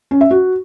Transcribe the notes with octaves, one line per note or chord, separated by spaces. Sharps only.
C#4
E5
F#4